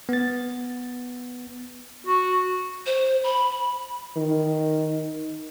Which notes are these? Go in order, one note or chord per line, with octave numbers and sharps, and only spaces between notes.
B3 A6
F#4
C5
B5
D#3